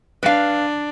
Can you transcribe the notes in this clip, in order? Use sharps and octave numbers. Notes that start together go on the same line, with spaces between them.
D4 B4 F5